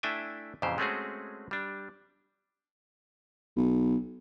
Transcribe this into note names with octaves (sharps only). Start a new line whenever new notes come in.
A3 D4 E4 E5 G5 G#5
F2 A#2 C#3 E3 G4 C5
G#3 A3 C4 C#4 F#4 G#4
G3 D4
B1